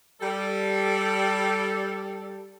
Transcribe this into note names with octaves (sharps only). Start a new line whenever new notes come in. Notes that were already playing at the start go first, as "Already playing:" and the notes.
G3 A4